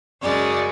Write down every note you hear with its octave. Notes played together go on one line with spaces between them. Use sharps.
F#2 C#3 G#3 D5